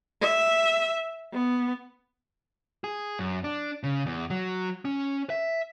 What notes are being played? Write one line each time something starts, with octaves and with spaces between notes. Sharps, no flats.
E5
B3
G#4
F#2
D4
C#3
E2
F#3
C#4
E5